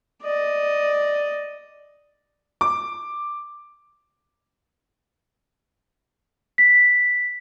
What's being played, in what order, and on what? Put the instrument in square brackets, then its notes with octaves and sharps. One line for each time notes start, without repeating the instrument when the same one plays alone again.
[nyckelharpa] D5 D#5
[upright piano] D6
[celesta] B6